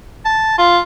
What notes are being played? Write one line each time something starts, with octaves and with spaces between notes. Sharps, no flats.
A5
F4